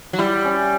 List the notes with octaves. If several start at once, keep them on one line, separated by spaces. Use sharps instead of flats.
F#3
G3 E4
C#4